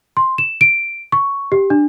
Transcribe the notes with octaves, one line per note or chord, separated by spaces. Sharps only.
C6
E7
D7
C#6
G4
D4